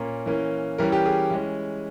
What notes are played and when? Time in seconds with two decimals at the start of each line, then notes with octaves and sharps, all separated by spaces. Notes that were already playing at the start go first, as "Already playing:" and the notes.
Already playing: A#2 A#3 C#4 A#4
0.26 E3 A#3 C#4
0.78 E3 G3 C#4 A#4
0.92 G4
1.05 G#4
1.31 E3 G#3 C#4